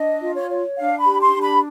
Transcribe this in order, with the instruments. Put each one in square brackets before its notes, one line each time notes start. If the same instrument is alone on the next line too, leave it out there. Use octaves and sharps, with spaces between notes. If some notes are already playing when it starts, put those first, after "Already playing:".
Already playing: [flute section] D4 D#5
F4
C#5
C#5
D4 F5
B5
G4
C6
D4
B5